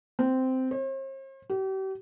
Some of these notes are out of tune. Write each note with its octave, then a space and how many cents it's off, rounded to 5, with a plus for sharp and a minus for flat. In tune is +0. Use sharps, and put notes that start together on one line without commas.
C4 -10
C5 +45
G4 -40